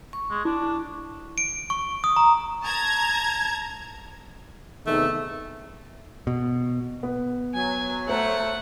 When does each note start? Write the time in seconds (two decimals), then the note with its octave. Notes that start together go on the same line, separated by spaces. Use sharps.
0.13 C#6
0.31 G#3
0.45 D4 E4
1.38 D7
1.70 C#6
2.04 D#6
2.16 A#5
2.64 A5 A#5 G#6
4.86 E2 C3 D#3 A3
6.27 B2
7.03 B3
7.54 F#3 G#5
8.08 A3 C5 F#5 A#5